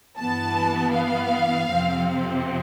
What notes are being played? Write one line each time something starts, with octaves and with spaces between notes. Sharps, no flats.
G2 E3 B3 A5
F5
F2 C3 F3 C4